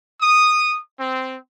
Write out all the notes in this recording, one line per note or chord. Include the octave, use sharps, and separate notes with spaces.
D#6
C4